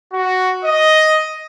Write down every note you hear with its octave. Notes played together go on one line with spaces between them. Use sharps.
F#4
D#5